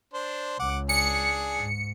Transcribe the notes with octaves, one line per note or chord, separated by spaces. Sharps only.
D4 C5
C#2 F#5 D6
D4 G#4 C#7
G#2